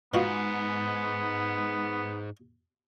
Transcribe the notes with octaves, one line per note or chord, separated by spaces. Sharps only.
G#2 B2 B3 F4 F#4